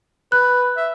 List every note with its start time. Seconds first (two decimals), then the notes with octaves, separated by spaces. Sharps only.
0.32 B4 F#6
0.77 E5